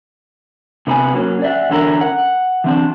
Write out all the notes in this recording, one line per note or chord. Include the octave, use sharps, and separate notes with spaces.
C3 B3 B4 C5 G#5
F#3 A#3 C#4
D5 E5 F#5
E2 D3 C#4 E4 A#4
F#5
E3 C4 D4